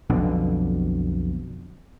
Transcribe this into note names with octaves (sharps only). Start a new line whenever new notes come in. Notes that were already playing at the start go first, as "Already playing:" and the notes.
B1 F2 B2 D3